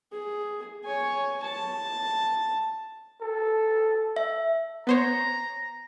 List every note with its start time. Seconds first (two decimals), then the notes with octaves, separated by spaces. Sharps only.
0.12 G#4
0.85 C#5 G#5
1.42 A5
3.21 A4
4.16 E5
4.87 B3 C5 C#5 A#5